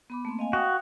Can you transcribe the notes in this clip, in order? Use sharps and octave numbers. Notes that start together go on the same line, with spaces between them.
B3 B5 D6
A3 A#3 C4
D#5 F5 G#5
F#4 F5 G5 D#6